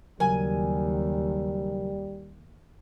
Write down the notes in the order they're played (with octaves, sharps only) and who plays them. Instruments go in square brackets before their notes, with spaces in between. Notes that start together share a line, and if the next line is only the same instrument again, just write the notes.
[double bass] D#2 [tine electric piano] C#3 F#3 A#4 [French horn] G3 [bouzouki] G#5